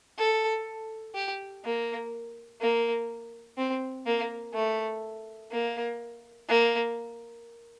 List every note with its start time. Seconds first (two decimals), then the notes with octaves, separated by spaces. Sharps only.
0.19 A4
1.15 G4
1.65 A#3
2.61 A#3
3.58 C4
4.06 A#3
4.54 A3
5.52 A#3
6.48 A#3